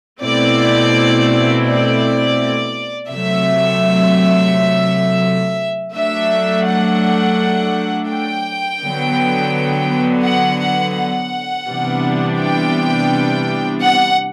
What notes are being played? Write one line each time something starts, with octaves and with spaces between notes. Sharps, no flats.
B2 A3 C4 E4 D5
D5
C3 F#3 A3 E5
F#3 A3 D4 E5
F#5
G5
D3 F#3 B3
F#5
F#5
F#5
C3 E3 G3 B3 D4
G5
F#5